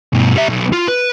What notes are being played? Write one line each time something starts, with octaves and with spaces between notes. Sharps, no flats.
G2 B2
G3 E5
B1
F4
B4